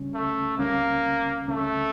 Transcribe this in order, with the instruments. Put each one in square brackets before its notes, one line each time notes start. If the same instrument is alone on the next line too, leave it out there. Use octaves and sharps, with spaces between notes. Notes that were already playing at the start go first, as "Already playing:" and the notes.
Already playing: [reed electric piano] C#2 C#3 G3 C#4
[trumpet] A3
[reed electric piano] C#2 C#3 G3 C#4 [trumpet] A#3
[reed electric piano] C#2 C#3 G3 C#4 [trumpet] A3